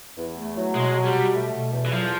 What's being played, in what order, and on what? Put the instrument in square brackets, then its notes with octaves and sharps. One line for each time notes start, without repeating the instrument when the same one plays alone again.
[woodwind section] E2
A3
F#3
[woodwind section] B2 [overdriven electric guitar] G#3
[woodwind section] F#3
[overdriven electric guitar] G3
[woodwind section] B2
A3
B2
E2
[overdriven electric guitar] E3
[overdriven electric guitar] F3 [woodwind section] F#3